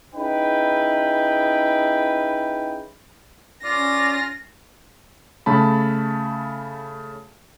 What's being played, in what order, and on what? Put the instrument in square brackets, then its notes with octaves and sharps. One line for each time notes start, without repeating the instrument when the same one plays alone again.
[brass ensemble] C#4 D#4 E4 G#4 B4 G5
[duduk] C#4 [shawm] F4 [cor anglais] D5 [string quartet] A#6
[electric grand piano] C#3 A3 A5 B5